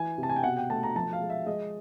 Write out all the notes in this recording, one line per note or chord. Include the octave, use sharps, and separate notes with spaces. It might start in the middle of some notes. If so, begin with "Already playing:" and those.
Already playing: E3 G#5
C3
A5
G#5
G5
B2 F#5
G5
A3 A5
A#5
F3 A5
F5
G#3
E5
G#3 D#5